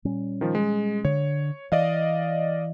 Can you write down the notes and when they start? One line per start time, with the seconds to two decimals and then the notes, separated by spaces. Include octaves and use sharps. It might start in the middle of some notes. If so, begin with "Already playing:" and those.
0.05 A#2 G3 C#4
0.41 D#3 F3
0.55 G#3
1.05 D3 C#5
1.72 E3 D5 D#5 F5